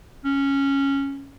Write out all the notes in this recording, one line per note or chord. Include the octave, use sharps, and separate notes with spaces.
C#4